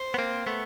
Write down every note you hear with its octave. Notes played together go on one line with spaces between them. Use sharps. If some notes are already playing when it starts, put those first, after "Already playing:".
Already playing: C5
B3
A#3 C4
A3 B3